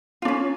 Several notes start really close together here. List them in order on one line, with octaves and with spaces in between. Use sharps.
F4 D4 C#4